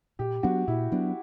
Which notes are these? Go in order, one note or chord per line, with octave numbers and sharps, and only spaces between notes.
A#2 G4
F#3 B3 D4 F#4
A#2 E4
F#3 B3 D4